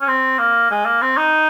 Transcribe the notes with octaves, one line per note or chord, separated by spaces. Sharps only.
C#4
C4
A#3
G#3
A#3
C4
D#4